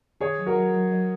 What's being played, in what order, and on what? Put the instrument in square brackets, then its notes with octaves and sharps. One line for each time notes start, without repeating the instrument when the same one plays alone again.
[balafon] D#3 [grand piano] G#4 C#5
[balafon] F#3
[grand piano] F#4 A#4
[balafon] F#3
F#3
F#3